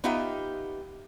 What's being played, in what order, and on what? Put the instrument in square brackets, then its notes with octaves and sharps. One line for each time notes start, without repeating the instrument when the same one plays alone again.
[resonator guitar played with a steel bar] B3 D#4 F4 G4 E5 G5